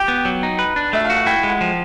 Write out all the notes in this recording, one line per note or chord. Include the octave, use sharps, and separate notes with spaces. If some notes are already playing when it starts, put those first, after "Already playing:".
Already playing: G4 G5
B3
F#3
D#4
B4
D4
A3 E5
F5
F#4
F#5
E4 G5
G#3
F#5
F3